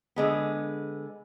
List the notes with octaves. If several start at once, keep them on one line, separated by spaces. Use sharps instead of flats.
D3 G#3 B3